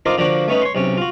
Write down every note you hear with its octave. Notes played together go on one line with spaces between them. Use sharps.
D4 D#4 F4 A#4 C5 D5
D3 F3 A#3 D4 F#4
A3 B3 C#4 D#4 B4
C#5 C6
B1 C3 C#4
F4 F#4